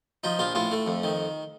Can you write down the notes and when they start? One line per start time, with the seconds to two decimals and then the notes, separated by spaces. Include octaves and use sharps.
0.24 F3 D#4
0.39 A#1 F4
0.55 A2 F4
0.71 A3
0.86 F2
1.03 D#3